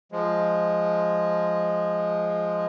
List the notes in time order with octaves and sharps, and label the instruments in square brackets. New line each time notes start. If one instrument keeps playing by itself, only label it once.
[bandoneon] F3 G#3